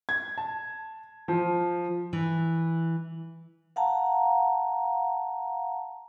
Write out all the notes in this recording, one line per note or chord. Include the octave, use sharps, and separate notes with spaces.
G#6
A5
F3
E3
F5 F#5 A5 A#5